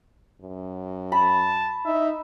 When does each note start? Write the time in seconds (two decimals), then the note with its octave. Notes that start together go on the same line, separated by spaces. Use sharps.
0.41 F#2
1.12 A5 B5
1.85 D#4 E5